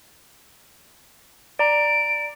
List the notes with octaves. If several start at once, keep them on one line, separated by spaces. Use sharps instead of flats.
D5 A#5 D7